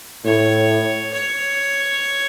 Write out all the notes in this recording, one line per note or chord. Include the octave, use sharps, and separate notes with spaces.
A2 C#5
C#5